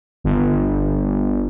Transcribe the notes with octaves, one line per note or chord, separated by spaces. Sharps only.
G1